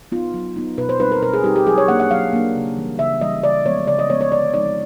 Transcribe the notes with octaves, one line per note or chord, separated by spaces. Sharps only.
B3 D#4 F4
F#3
B3 D#4
B2 B4
C5
G3 C4 D#4 B4
A#4
B2 A#4
G#4
G3 C4 D#4 G4
G4
F#3 G#4
C#5
A#3 D4 F#5
F#5
F#3 F5
A#3 D4
C#3
E3 G3
C#3 E5
E3 G3 D#5
C#3 D5
F3 G#3 B3 C#5
C#3 D5
D#5
F3 G#3 B3 C#5
C#5
D3 D5
F3 G#3 C4 D#4 D5